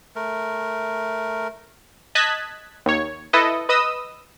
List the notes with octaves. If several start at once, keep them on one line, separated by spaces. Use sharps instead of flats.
A3 A#4
D#5 A5 F#6 G#6 B6
D#2 C#5
E4 A4 B4 D#5
B4 D#5 D#6 E6